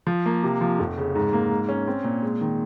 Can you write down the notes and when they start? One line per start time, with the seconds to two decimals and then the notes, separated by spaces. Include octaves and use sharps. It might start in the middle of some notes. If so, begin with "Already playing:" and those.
0.07 F3
0.26 A#3
0.43 C3
0.61 F3
0.79 F1
0.97 C#3
1.15 G#2
1.33 A#3
1.51 G#2
1.69 C#4
1.87 C4
2.04 A#2
2.22 G#3
2.41 D#3